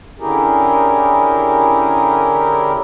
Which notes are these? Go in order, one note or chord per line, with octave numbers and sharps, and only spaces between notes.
D3 C#4 E4 G4 G#4 A#4